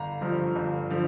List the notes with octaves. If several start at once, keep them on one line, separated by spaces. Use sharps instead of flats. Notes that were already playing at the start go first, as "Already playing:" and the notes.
Already playing: G1 A#5
G2 D3 F3
G1
D3 F3